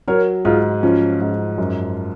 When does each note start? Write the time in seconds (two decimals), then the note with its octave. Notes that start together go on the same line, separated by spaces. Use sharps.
0.08 F#3 A#4 C#5
0.45 G#2 F4 G#4
0.83 F3 C#4 F4
1.20 G#2
1.58 F#2